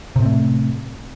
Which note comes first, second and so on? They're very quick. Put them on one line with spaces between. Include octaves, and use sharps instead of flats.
C3 A2 C4 A3